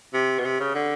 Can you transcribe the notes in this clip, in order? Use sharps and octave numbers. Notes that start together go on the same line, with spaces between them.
C3
B2
C3
C#3
D3